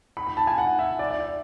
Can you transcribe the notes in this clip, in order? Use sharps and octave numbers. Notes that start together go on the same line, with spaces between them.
B5
B5
A5
G#5
F#5
E5
D5
D5
E5